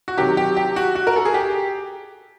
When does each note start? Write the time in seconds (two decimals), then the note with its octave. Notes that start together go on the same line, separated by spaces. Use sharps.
0.08 F#4
0.17 C3 D#3 F#3 G4
0.37 G4
0.57 G4
0.76 F#4
0.95 F#4
1.07 A#4
1.16 A4
1.25 G#4
1.34 G4